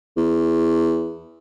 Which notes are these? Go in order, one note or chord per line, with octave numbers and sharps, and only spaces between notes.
E2